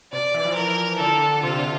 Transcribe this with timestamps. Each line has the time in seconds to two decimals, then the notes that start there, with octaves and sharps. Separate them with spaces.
0.13 C3 D5
0.34 E3
0.45 F3
0.55 E3 A#4
0.99 D3 A4
1.43 C3 F4
1.58 D3